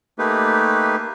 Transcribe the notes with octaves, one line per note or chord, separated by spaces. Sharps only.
A3 A#3 D#4 G4 B4